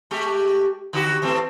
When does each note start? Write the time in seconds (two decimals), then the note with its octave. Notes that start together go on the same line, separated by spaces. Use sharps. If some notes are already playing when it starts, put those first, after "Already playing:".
0.11 G#3 A3 G4
0.93 D3 F#4 G4
1.22 E3 A3 C4